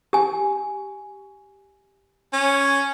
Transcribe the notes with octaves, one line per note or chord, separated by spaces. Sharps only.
G4 G#5
C#4